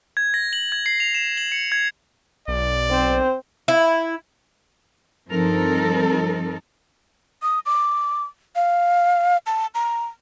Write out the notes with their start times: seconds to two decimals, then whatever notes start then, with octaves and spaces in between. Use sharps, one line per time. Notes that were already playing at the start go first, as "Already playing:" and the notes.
0.17 G#6
0.34 A#6
0.53 F#7
0.72 G#6
0.86 C7
1.00 F7
1.14 E7
1.37 F#7
1.52 C#7
1.72 G#6
2.48 B1 D5
2.91 C4 C5
3.68 E4
5.29 G2 F3 C4 D#4 A4 A#4
7.42 D#6
7.66 D6
8.55 F5
9.46 A5
9.75 A#5